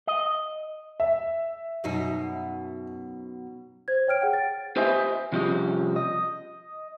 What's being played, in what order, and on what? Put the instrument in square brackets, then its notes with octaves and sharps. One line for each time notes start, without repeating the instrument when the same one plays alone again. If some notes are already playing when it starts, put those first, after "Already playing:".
[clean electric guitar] D#5
[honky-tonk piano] E5
[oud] F#2 B2 D#4
[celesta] C5 G#6
C#5 G5 F6 D7
G#4 F#5 G5
A6
[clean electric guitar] G4 B4 C5 D#5 E5 G#5
C3 F3 G3 C#4 G#4 D#5
D#5